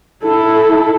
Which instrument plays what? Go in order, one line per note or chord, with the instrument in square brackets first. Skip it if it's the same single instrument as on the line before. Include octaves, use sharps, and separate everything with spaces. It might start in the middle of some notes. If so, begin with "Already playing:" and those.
[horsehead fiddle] E4 A4